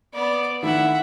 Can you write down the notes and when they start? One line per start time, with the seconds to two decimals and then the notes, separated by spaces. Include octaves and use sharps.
0.14 B3 D5
0.63 D#3 A3 D4 E4 E5 F#5